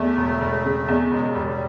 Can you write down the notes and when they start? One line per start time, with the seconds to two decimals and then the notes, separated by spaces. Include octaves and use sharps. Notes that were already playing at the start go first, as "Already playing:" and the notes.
Already playing: E2 A3
0.17 E1
0.41 E1
0.65 C#3
0.88 E2
1.11 E1 G#3
1.30 G3
1.35 E1
1.47 G3